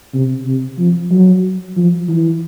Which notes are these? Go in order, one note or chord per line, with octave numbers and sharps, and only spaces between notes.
C3
C3
F3
F#3
F3
E3